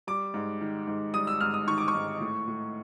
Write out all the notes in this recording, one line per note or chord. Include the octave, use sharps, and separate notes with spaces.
G3 D6
G#2
D#3
G#2
G3 D#6
E6
G#2 F6
D#6
D#3 C#6
D6
C#6
G#2
A2
A2